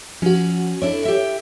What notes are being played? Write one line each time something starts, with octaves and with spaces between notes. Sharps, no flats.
F3 C#4 F#4
D4 E4 A4 C#5
G4 E5